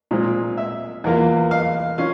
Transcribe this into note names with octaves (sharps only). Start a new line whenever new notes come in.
A#2 G#3 C4
E5
E2 E3 A#3 F4
F5
C#4 F4 F5